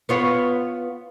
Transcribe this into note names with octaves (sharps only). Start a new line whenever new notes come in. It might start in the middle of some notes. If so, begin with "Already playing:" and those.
B3 F4 C#5